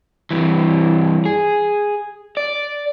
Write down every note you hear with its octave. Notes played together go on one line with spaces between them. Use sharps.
G2 E3
G#4
D5